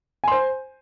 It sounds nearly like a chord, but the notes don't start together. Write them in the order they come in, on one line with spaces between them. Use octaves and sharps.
G#5 C6 C5